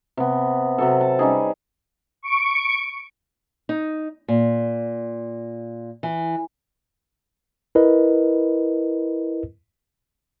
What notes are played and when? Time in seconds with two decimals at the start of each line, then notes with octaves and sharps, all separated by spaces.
0.17 C3 B3
0.78 C3 F#3 A4
1.01 A5
1.19 G3 C#4 D#4 G#4
2.22 C#6 D7
3.69 D#4
4.28 A#2
6.03 E3
7.75 E4 A#4 B4 D#5